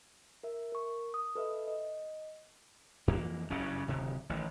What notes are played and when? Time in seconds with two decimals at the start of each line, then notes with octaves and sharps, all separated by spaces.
0.43 A#4 E5
0.72 A#4 C#6
1.14 D#6
1.35 A4 B4 D#5 E5
1.68 D#5
3.08 F2 E3 A#3
3.50 F#1 G2 C#3 C#4
3.88 D1 C3 D#3
4.29 A1 D#3